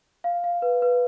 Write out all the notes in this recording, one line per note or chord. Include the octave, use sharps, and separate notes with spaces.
F5
F5
B4
B4